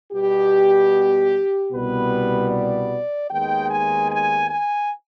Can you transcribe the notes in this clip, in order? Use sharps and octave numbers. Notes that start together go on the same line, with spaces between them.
B2 G3 B3 G4
C2 B2 G3 B3 B4
D5
D#2 D#3 G#3 B3 G5
G#5
G#5
G#5